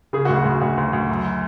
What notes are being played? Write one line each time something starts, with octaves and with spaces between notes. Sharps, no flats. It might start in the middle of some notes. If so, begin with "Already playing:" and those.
C#3 G#4
F#4
D2
F#4
D2
D2 F#4
D2
D2
F#2